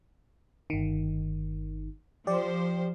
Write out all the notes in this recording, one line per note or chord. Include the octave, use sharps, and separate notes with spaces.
G1 D#3
F3 G4 C5 D5